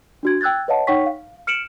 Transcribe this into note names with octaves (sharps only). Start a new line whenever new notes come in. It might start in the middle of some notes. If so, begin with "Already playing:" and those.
D4 F#4 G#6
G5 E6 F#6 G#6 A6
B4 C#5 D#5 F5 F#5 A5
D#4 C#5 F#5 G5 C#6 B6
F5
F6 C#7 D7 E7 F#7